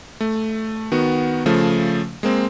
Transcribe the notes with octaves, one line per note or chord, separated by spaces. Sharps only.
A3
D#3 B3 F#4
C#3 F3 A3
G#3 A#3 C4